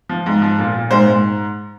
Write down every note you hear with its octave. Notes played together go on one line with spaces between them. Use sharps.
F3
G#2
F3
A#2
A#2
G#2 C5
G#2